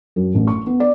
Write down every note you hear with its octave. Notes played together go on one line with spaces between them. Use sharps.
F#2
A1
C#6
B3
D5